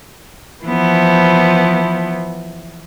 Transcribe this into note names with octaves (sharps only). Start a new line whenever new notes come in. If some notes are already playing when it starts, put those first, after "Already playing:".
E3 F3 B3